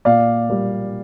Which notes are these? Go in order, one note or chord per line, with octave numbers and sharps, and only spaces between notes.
A#2 D5 F5
G3 A#3